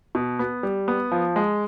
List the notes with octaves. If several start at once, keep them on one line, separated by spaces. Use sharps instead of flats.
B2
B3
G3
B3
F3
G#3